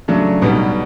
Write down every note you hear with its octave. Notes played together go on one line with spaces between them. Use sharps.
C#3 F#3 A3 D4
B1 B2 G3 B3